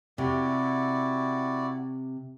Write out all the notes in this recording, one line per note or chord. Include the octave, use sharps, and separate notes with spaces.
C3 E4 F#4 D5